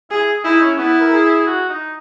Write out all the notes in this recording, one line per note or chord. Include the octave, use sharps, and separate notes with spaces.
E4 G#4
G#4
D#4 E4
C#4
B3 E4
A#4
G#4
F#4
D#4